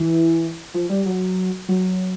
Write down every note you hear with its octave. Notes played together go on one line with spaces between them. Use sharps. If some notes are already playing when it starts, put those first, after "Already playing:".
Already playing: E3
F3
G3
F#3
F#3